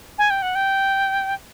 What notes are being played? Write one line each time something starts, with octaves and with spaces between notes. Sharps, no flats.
G#5
G5
F#5
G5